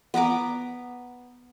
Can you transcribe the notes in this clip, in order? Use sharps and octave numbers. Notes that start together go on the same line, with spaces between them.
B3 B4 A#5 D6